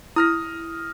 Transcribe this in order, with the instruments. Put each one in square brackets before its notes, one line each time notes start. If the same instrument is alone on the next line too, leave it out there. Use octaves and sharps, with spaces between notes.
[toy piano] E4 [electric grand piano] D#6 F6 A#6